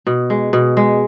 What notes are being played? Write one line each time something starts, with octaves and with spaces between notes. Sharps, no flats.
B2
G#3
B2
G#3